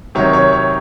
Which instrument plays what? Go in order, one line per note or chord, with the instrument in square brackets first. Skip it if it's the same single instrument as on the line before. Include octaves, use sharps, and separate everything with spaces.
[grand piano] C3 D#3 F#3 C#5
C#5
C#5